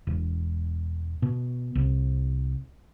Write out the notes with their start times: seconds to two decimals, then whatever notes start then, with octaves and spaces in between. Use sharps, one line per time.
0.07 E1
1.22 B2
1.75 C2